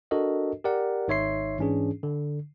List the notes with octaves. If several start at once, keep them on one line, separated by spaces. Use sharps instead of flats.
D4 F#4 A4 A#4 D#5
G4 A#4 D5 F#5
G#1 D#4 C#5 E5 C6 C7
G#2 E3 C#4 D4 G#4
D3